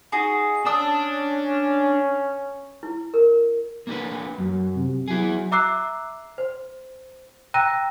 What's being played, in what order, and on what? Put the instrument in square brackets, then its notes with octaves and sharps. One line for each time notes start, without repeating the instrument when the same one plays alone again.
[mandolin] D#4 F#4 G#4
[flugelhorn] C#4 [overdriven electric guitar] D4 [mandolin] A5 D#6 E6
[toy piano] E4
A#4
[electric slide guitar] A#3 D4 B4
[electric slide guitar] F#2 [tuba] F#3
[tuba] C3
[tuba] F#3 [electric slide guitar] E4 G#4
[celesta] E5 A#5 D6 E6 F#6 C7
C5
G5 A#5 E6 F#6 A#6 D#7